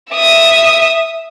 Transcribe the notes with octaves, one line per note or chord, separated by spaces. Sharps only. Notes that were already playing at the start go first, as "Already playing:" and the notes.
E5 D#6